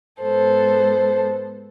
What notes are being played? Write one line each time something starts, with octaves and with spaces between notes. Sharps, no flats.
G#2 G#3 B3 A4 C5